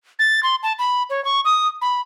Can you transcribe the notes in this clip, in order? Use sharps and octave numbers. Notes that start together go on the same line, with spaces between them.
A6
C6
A5
B5
C#5
C#6
D#6
B5